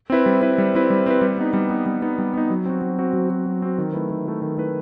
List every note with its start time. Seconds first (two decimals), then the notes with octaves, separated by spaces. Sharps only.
0.10 C4 E4 B4
0.26 G3
0.42 C4 E4 B4
0.58 G3
0.75 C4 E4 B4
0.90 G3
1.06 C4 E4 B4
1.21 G3
1.38 B3 D#4
1.54 G3
1.70 B3 D#4
1.86 G3
2.02 B3 D#4
2.19 G3
2.34 B3 D#4
2.50 F#3
2.66 C4 F#4
2.82 F#3
2.99 C4 F#4
3.13 F#3
3.30 C4 F#4
3.46 F#3
3.62 C4 F#4
3.78 D#3
3.93 A3 E4 B4
4.10 D#3
4.26 A3 E4 B4
4.42 D#3
4.57 A3 E4 B4